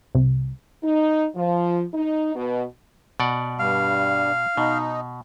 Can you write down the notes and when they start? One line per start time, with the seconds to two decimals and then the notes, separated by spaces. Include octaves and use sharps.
0.15 C2
0.84 D#4
1.36 F3
1.94 D#4
2.36 B2
3.20 B2 D5 F#5
3.59 G2 G3 F5
4.57 B2 D#4